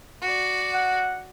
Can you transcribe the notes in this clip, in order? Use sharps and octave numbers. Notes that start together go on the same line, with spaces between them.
F#4 D5
F#5